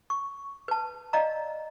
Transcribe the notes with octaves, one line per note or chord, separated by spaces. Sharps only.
C#6
B4 A5
D5 D#5 F5 A#5